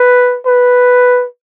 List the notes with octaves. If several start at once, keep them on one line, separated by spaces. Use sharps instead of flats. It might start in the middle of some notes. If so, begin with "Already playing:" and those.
Already playing: B4
B4